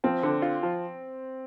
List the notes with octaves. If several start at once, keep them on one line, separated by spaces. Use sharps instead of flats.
F3 C4
D3
F4
F3